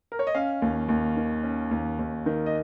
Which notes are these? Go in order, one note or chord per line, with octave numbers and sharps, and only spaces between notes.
A#4
C#5
D#5
C#4 F5
D#2
D#2
D#3
C#4
D#2
D#2
D#3
D#5